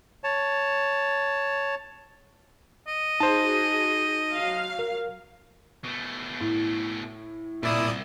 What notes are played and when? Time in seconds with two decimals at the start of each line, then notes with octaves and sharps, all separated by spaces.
0.24 C#5 A5
2.88 D#5
3.20 D#4 F#4 G#4 C5 A5
4.33 F#3 F5
4.79 A#4
5.84 B2 A3
6.40 A2
7.63 C2 A#2 E4 D5 D#6